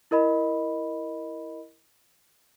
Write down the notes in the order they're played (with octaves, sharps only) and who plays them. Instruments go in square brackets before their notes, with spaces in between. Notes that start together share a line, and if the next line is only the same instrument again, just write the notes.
[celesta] E4 A#4 D#5 B5